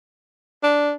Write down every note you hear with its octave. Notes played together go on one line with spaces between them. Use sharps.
D4